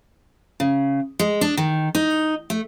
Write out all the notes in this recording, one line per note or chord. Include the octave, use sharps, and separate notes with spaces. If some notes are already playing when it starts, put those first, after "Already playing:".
C#3
G#3
D4
D#3
D#4
A3